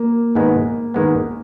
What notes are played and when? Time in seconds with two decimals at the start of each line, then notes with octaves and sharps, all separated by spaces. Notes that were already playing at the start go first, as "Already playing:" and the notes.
Already playing: A#3
0.35 G#2 D#3 G#3 B3
0.94 G#2 D#3 G#3 B3